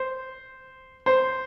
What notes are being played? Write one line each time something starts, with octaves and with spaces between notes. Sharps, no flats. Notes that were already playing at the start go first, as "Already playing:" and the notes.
Already playing: C5
C5